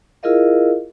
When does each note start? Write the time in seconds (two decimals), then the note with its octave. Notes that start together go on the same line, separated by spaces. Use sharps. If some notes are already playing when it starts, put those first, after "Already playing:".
0.23 E4 F4 G#4 A#4 D#5 F5